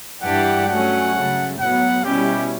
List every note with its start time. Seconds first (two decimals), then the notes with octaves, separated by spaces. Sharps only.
0.22 G2 E3 G3 D4 G4 F#5
0.68 F#3 A3 C#4 F#5
1.14 C#3 F#3 A3
1.59 A2 F#3 B3 F#5
2.04 B2 G3 C#4 E4 G4